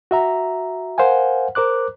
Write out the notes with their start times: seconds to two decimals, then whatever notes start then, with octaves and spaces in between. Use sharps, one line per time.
0.11 F#4 E5 A#5
0.98 A#4 C5 F5 F#5 G#5
1.55 A#4 C5 D6 F#6